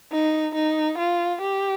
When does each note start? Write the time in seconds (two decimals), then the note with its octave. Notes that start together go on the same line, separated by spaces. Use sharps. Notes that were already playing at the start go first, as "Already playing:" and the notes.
0.12 D#4
0.55 D#4
0.98 F4
1.42 G4